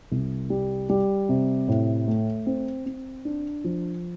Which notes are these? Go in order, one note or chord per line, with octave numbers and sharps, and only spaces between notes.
C2
G3
G3
C3
A2
A3
C4
C4
D4
F3